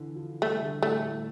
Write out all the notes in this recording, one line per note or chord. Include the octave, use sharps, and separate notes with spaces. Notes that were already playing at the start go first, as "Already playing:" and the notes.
Already playing: D3 E3
F3
G3 A3
D3
A2 A3
A2